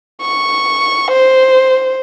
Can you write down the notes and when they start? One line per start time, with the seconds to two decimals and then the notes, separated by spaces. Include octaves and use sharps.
0.21 C#6
1.11 C5